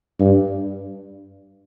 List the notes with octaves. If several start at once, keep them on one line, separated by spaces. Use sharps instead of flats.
G2